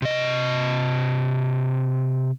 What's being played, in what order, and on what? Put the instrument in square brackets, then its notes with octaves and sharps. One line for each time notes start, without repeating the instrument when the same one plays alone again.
[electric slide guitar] C3 D#5